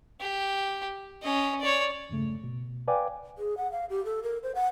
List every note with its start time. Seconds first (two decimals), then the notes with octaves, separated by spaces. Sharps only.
0.20 G4
1.22 C#4 D#5
1.60 C#5 D5
2.09 E2 G2 C#3 A3
2.44 B2
2.88 B4 D5 F5 G5 G#5 D6
3.38 G#4
3.57 F#5
3.72 F5
3.90 G4
4.05 A4
4.23 A#4
4.43 C5
4.55 F#5